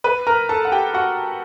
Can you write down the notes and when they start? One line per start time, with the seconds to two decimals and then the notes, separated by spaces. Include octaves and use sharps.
0.04 B4 B5
0.27 A#4 A#5
0.49 A4 A5
0.65 F#5
0.72 G4 G5
0.94 F#4 F#5